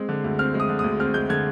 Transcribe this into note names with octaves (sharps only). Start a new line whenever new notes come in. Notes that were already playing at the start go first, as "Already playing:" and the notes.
Already playing: G#3 C4
D3
D2
C4 F6
G#3
D#6
D3
D2 D#6
C4 F6
G#3 G6
D3 G#6